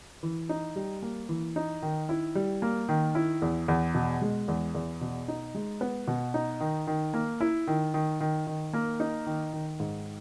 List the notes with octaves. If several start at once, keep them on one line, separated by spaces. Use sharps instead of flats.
E3
D#4
G3
A#3
E3
D#4
D#3
E4
G3
A#3
D#3
E4
E2
E2
B2
G#3
E2
E2
B2
D#4
G#3
B3
B2
D#4
D#3
D#3
A#3
E4
D#3
D#3
D#3
D#3
A#3
D#4
D#3
D#3
G#2